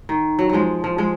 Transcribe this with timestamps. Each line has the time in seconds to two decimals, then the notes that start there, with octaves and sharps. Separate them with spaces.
0.09 D#3
0.39 F#3
0.49 F3 F#3 G#3
0.84 F3
0.98 F3 G#3